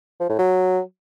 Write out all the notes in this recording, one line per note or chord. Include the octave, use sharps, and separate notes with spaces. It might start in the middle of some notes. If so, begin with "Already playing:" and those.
F3
A2
F#3